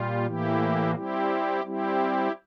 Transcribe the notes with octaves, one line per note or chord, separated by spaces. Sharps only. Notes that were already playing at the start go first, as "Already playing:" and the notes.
Already playing: A#2 G3 F4
A2 E3 A#3 E4 G4
G3 C4 E4 G4
G3 C4 E4 G4